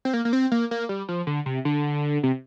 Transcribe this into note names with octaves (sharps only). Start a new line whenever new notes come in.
C4
A#3
A#3
C4
A#3
A#3
G3
F3
D3
C3
D3
C3